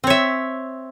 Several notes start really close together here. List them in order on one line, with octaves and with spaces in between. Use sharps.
C4 C#5 E5